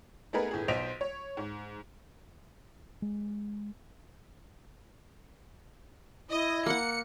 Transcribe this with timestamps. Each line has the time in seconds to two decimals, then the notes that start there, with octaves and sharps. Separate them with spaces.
0.33 A3 B3 D#4 G#4 A#4 B4
0.51 G1 A2 G#4
0.68 B1 C5 D#5 B6 D7 F7
1.01 C#5
1.37 G#2
3.02 G#3
6.30 E4 D#5
6.66 A#3 F#5 C#7